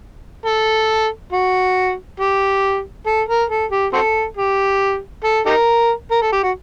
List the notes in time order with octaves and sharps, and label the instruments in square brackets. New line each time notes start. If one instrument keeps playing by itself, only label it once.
[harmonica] A4
F#4
G4
A4
A#4
A4
G4
C4 F#4 A4
G4
A4
D#4 G4 A#4
A#4
A4
G4
F#4